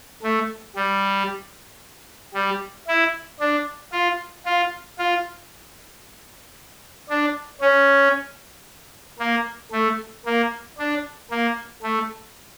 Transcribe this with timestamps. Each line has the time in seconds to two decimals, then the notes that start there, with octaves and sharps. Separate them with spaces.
0.23 A3
0.76 G3
2.34 G3
2.88 E4
3.40 D4
3.92 F4
4.46 F4
4.98 F4
7.09 D4
7.61 C#4
9.19 A#3
9.72 A3
10.26 A#3
10.78 D4
11.31 A#3
11.83 A3